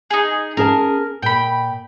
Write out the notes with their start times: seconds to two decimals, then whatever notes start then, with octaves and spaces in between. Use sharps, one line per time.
0.10 D#4 G#4
0.57 C#4 G#4 A#4 A5
1.22 A#2 G5 B5